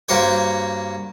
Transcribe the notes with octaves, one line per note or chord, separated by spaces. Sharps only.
G2 A#3 F#4 C5 C#5 G5